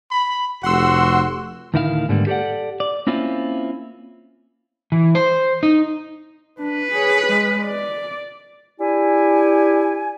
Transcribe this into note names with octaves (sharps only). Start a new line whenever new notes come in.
B5
F1 F#4 F#5 C6 E6
D2 A2 D#3 E4 F4 F5
G#2 D3 G3 A#3 B3
G4 A4 C#5 D5 F#5
D5
A#3 C4 C#4 E4 F4 F5
E3
C5
D#4
D4 B4
G#4 C#5
G#3
D5
D4 E4 G4 G#5